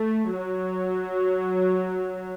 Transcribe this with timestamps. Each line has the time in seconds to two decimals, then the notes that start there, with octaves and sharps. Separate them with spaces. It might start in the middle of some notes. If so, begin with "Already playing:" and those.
Already playing: A3
0.34 F#3